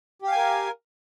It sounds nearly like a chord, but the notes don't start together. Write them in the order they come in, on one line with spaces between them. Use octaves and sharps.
G4 F5 G#5 A#4